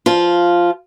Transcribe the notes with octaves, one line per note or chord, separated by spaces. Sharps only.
F3 F4